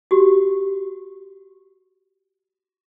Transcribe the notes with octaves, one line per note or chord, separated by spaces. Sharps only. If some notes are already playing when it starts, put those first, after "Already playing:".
F#4 G4